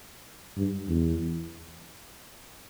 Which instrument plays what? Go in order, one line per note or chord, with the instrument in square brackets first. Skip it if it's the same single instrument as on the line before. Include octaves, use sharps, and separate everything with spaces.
[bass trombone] G2
E2